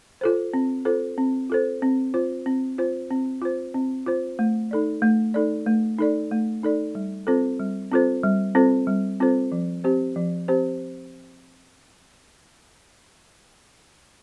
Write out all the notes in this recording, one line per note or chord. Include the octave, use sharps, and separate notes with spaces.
F4 A4 C5
C4
F4 A4 C5
C4
F4 A4 C5
C4
F4 C5
C4
F4 C5
C4
F4 C5
C4
F4 C5
A3
D#4 A4 D5
A3
D#4 A4 D5
A3
D#4 A4 D5
A3
D#4 A4 D5
G3
C4 F4 A4 C5
G3
C4 F4 A4 C5
G3
C4 F4 A4 C5
G3
C4 F4 A4 C5
F3
C4 G4 C5
F3
C4 G4 C5